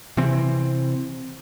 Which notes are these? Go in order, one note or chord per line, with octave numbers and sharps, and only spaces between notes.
C3 E3 C4